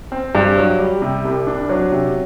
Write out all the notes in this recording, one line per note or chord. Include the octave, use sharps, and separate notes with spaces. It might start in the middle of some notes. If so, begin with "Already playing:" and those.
C4
G2
F#3
G3
C3
C2
D4
F#3
C3